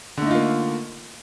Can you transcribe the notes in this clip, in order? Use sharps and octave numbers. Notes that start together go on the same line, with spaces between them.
D3 A3 A#3 D#4 F4